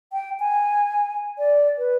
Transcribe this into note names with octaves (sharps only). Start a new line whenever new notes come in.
G5
G#5
D5
B4